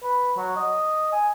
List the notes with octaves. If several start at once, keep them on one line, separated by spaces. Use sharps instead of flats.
B4
F#3
D#5
G#5